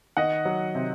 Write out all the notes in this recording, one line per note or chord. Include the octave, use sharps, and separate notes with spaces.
D#3 D#5 F#5
F#3
C3